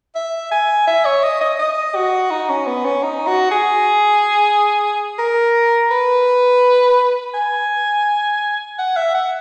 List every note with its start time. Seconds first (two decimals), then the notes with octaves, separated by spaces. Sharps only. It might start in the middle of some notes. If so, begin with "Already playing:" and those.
0.15 E5
0.51 G#5
0.87 E5
1.05 C#5
1.23 D#5
1.41 D#5
1.59 D#5
1.95 F#4
2.31 D#4
2.49 C#4
2.67 B3
2.85 C#4
3.03 D#4
3.27 F#4
3.51 G#4
5.19 A#4
5.91 B4
7.34 G#5
8.79 F#5
8.97 E5
9.15 F#5